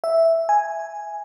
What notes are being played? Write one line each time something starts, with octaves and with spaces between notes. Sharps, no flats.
E5
G#5